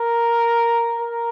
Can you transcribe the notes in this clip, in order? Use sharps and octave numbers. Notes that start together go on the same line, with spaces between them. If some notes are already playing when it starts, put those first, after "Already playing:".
Already playing: A#4
A#4